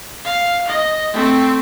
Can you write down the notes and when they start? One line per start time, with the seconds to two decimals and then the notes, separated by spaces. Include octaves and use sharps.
0.24 F5
0.68 D#5
1.13 A3 C4